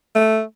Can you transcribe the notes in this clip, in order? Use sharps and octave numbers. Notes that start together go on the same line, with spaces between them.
A3